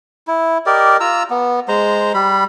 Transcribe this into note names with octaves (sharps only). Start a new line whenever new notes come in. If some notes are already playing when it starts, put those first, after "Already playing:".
E4
G4 A#4 D5 D#5
F4 A#5 E6
B3
G#3 C5 A#5
G3 B5